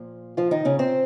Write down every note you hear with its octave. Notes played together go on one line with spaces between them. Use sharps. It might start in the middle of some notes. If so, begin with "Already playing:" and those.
Already playing: A#2 F3
F3 F4
D#3 D#4
C#3 C#4
C4 C5